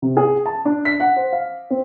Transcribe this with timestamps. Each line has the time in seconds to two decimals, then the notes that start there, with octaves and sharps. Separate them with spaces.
0.02 C3
0.17 G#4
0.46 A5
0.65 D4
0.85 B6
1.00 F#5
1.16 C5
1.33 F5
1.70 C4